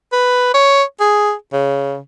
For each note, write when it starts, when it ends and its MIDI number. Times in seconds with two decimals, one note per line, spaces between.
0.12 0.50 71
0.54 0.83 73
1.00 1.33 68
1.53 1.98 49